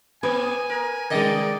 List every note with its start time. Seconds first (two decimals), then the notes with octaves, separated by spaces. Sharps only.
0.23 A#3 C4 B4 G#5
0.69 A#4
1.11 C3 D#3 G#3 D5 D#5